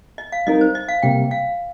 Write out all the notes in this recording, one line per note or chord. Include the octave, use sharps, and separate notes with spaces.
D#5
F5
G3 C4 D#4 A#4 D#5
C5
D#5
F5
C3 G3 A#3 G5
F5